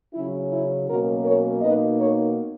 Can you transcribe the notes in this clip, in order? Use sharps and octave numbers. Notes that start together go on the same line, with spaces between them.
C#3 F#3 C#4 E4
E4
B2 F#3 A#3 C#4 F#4 A#4
A#4 C#5
B2 A#3 D#4 B4 D#5
A#4 C#5